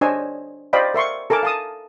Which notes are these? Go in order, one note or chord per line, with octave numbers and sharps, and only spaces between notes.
D4 C5 C#5 D#5 G#5 E6
C5 D5 D#5 F5 G5 B5
A#4 E5 C6 C#6
A4 A#4 G#5 A5 D6
F5 A5 D#6